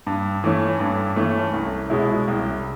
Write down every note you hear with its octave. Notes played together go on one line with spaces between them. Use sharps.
G2
E3 A3 C#4
G2
E3 A3 C#4
C2
B2 G#3 C#4 E4
C2